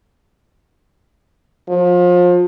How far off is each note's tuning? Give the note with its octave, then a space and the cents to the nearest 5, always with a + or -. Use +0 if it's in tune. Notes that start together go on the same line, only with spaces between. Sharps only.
F3 +30